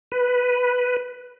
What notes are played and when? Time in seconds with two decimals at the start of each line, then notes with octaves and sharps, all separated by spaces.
0.12 B4